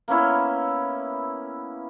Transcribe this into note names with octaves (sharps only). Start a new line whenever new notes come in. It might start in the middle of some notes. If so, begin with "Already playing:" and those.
A#3 B3 C#4 E4